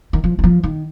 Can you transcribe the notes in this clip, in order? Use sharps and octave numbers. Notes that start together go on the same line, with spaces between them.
D#3
F3
D#3
F3
D#3